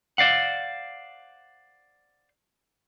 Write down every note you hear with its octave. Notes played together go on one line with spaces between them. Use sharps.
C5 D5 F5 F#5